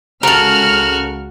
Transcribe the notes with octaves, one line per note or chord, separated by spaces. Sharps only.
C#2 C#3 F#4 A4 A#4 F6